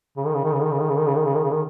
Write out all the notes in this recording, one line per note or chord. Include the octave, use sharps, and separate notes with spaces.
C#3
D#3
C#3
D#3
C#3
D#3
C#3
D#3
C#3
D#3
C#3
D#3
C#3
D#3
C#3
D#3